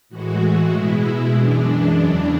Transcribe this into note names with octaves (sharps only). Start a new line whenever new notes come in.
A2 E3 G#3 F#4
B2 G#3 E4
E4
F#2 E3 G#3 D4
D4
E2 C#3 E3